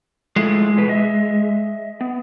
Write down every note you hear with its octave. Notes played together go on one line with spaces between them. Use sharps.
F3 G#3 A3 E4
E2 B2 B4
D#5 E5
B3